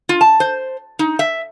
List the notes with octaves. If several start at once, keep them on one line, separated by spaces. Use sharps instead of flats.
F4
A5
C5
D#4
E5